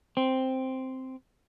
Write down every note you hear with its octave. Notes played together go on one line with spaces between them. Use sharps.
C4